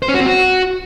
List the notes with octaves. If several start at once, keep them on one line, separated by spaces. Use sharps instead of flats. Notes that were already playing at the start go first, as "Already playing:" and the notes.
C5
C#4
F#4
C4
F#4